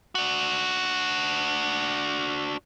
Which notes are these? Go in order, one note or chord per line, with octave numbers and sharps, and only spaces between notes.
D4 F#4